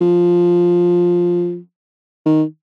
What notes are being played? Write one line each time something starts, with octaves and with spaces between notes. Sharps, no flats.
F3
D#3